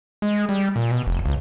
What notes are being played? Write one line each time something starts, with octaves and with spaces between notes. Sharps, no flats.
G#3
G3
A#2
B2
F1
C#2